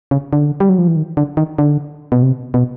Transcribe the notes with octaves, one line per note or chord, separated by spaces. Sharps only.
C#3
D3
G3
F#3
F3
E3
D#3
D3
D#3
D3
B2
C3
B2